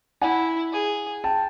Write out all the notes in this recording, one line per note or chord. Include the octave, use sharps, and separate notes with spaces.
E4 F#5 G#5
G#4
G5 A5